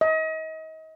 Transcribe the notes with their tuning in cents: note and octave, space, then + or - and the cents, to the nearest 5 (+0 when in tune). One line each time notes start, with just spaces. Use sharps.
D#5 +35